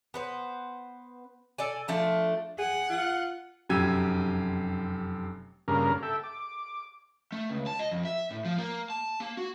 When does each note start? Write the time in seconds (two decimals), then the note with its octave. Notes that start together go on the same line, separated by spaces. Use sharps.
0.14 B3 B4 C5
1.58 A4 D5 G#5
1.88 F3 A3 D4
2.58 G#4 F#5
2.90 F4
3.69 F1 F#2 G4 E6 G#6 D#7
5.68 G2 C#3 A#3 A#4
6.03 A4 E5 G5
6.23 D6
7.32 A3
7.50 C#2
7.67 A5
7.79 D#5
7.91 F2
8.05 E5
8.31 A2
8.45 F3
8.58 A#3
8.90 A5
9.20 A#3
9.37 F#4